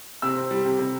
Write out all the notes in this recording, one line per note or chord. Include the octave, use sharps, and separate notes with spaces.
C3 E6
C4
G3
C3
C3